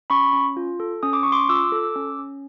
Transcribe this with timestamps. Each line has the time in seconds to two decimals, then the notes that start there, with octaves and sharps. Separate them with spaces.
0.10 C#4 B5 C#6
0.33 C#4
0.57 F4
0.80 A4
1.03 C#4 D#6
1.13 D6
1.23 C#4 C#6
1.32 C6 D6
1.49 F4 D6 E6
1.72 A4
1.96 C#4
2.19 C#4